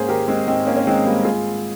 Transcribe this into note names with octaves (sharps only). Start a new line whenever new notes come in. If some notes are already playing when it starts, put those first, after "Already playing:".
Already playing: G#2 A#3 C#4 G#4 C5
D#3 G4 A#4
G#3 C4
G#2 C4 D#4
A#3 C#4
C#4
D#3 G#3 C4
G3 A#3
G#2 F4 G#4